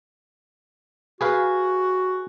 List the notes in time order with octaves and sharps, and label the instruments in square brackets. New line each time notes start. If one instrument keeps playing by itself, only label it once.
[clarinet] F#4 [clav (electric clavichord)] G#4 B4 F5